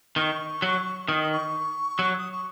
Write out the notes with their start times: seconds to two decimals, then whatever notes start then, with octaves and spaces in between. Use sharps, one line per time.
0.16 D#3 C#6
0.62 F#3
1.08 D#3 D#6
1.32 C#6
1.99 F#3
2.18 D#6
2.32 C#6